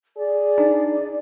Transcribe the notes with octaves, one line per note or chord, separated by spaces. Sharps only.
G#4 D5
D4 D#4